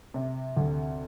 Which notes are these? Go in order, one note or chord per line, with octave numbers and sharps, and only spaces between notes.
C3
D2